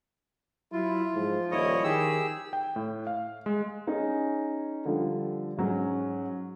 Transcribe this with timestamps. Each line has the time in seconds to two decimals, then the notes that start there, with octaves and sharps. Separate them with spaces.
0.72 F#3 E4 F4
1.15 G#2 F3
1.51 D#1 E4 C#5 D#5
1.84 D#3 G4 G#4 E6
2.53 G5
2.76 A2
3.07 F5
3.46 G#3
3.87 C#4 D#4 G#4
4.85 D3 F3 G3
5.57 G#2 F#3 C#4